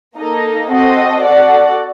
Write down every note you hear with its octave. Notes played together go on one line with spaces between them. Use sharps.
A#3 D#4 A4 D#5
C4 F#4 A4 C5 D#5
F#4 A4 D5 F#5